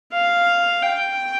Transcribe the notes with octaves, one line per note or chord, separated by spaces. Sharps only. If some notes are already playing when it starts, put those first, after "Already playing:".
F5
G5